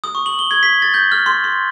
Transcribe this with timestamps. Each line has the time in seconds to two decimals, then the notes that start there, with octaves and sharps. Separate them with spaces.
0.04 D#6
0.15 C#6
0.26 F#7
0.39 G7
0.51 G#6
0.63 B6
0.82 A6
0.94 G6
1.12 F6
1.26 C6
1.44 C6